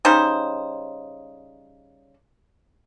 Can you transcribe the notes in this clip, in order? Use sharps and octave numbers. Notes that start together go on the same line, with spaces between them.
C#3 G3 D#4 C5